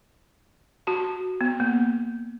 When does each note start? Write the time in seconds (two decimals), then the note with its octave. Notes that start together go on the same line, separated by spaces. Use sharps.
0.87 F#4 A5
1.41 B3
1.60 A#3